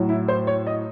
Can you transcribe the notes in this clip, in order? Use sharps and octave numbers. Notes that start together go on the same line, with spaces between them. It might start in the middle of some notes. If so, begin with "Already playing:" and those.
Already playing: A2 F#3
E4
C5
C#5
D#5